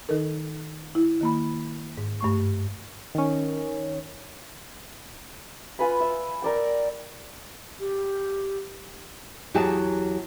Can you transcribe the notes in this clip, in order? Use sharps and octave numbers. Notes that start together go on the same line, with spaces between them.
D#3 D#4 A4 A#4
E4
D#3 A#3 B5
G#2
G2 A3 C#6
D#3 C#4
F4 B4 G#5 B5
E5
A#4 D5 G5
G4
E2 F#3 G4 G#4 E5 A5